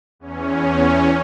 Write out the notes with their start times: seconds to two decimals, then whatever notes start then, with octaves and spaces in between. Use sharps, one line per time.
0.20 E2 C#4